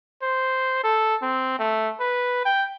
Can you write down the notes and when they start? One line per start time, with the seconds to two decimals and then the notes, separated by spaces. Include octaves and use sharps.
0.22 C5
0.83 A4
1.22 C4
1.59 A3
2.00 B4
2.45 G5